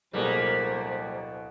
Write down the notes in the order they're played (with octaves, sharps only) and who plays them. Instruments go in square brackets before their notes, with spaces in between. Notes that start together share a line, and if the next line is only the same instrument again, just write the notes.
[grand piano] D1 B2 G#4 [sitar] G3 A#3 [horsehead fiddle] C5